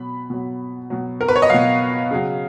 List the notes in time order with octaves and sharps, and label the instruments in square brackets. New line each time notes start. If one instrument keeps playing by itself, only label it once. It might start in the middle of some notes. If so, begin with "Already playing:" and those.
Already playing: [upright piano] B2 F#3 B5
B2 F#3
B2 F#3
A#4
B4
C#5
D#5
B2 F#3 F5
C#3 F#3